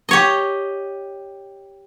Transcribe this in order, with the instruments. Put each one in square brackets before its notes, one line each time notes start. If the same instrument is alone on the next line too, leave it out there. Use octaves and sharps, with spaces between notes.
[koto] G4 C#5 D#5